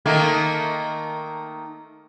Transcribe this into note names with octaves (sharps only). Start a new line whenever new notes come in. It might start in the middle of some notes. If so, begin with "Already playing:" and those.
D#3 A3 A#3